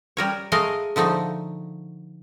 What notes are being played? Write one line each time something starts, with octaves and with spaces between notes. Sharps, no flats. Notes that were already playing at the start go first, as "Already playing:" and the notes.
G3 A#4 C#5
G#3 A3 G#4 A#4 D#5 F5
D3 F3 A3 D#4